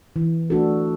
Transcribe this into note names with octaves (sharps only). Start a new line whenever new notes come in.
E3
A3 D4 F#4 A4